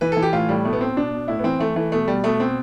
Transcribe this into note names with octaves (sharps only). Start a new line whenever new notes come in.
E3 B4
E3 A4
G4
A2 F4
A2 G3
B2 A3
B3
B2 C4
B2 D4
B2
A2 E4
B3
E3 C4
E3 A3
E3 A3
B2 A3
B2 G3
B2 A3
B2 C4